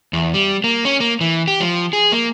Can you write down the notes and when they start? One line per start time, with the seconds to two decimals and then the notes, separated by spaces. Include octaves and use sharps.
0.13 E2
0.34 G3
0.64 A#3
0.85 C#4
1.00 A#3
1.21 E3
1.48 G4
1.60 F3
1.93 G#4
2.12 A#3